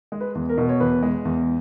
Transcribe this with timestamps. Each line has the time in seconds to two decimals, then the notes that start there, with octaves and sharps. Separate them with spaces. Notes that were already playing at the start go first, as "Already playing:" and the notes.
0.12 G#3
0.20 B4
0.35 E2
0.49 A#4
0.57 B2
0.69 C#5
0.80 E2 B4
1.03 G#3
1.25 E2